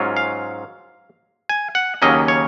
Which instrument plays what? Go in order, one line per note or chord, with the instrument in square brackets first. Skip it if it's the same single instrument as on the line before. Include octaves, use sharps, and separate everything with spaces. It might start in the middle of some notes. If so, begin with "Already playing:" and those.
Already playing: [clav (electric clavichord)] G#2 F#3 C#4 F4
F5
G#5
F#5
D#2 C#3 F#3 A#3 C#4 D#5
C#5